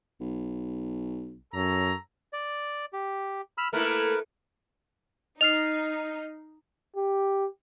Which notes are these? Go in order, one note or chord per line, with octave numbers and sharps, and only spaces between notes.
B1
F#2 A4 C#5 A#5
D5
G4
B5 E6 F6
A3 A#3 E4 A#4 B4
D#4 D#5 F6 C7 F7
G4